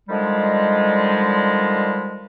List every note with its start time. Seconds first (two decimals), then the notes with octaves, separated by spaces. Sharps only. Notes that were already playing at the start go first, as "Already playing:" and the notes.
0.09 D3 D#3 F3 G3 G#3